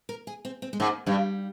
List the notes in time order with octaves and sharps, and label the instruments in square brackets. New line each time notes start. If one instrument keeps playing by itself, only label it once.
[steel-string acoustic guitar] A#4
G#4
C4
C4
G#3
[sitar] G#2 [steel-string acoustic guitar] A#3
[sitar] G2 [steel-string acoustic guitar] G3